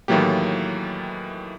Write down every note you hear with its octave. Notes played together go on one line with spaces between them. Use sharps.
A2 D#3 E3 F#3 A#3 G4